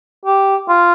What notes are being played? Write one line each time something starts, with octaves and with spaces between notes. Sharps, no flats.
G4
F4